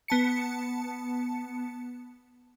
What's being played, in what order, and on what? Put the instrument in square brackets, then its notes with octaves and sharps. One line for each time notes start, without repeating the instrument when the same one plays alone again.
[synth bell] B3 A5 C#7